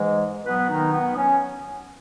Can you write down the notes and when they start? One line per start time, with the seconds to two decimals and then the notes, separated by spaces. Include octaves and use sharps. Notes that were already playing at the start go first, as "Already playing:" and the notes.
Already playing: G#2 E3 G#3
0.45 B2 F#3 B3 B4
0.69 D#3 D#4
0.92 B3
1.16 C#4